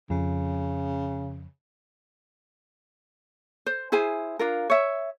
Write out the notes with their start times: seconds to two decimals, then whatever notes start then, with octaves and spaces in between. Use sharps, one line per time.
0.10 F2 C#3
3.66 C5
3.92 E4 G#4 C5 G#5
4.39 D4 F4 A#4
4.70 C#5 E5